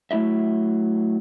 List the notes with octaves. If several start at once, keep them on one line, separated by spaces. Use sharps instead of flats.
F#3 A3 E4 D#5 E5